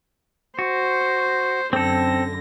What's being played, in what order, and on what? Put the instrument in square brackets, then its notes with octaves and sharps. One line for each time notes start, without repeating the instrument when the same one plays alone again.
[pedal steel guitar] F#4 [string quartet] C5
[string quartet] F#2 D3 A#6 [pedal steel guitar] C4 A4